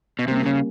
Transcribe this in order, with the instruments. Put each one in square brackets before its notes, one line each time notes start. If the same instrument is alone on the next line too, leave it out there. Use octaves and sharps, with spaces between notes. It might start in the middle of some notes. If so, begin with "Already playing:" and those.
[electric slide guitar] B2
[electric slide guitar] C3 [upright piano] G3 A#3 C#4
[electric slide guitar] C#3